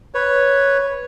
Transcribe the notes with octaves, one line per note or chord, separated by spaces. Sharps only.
B4 C#5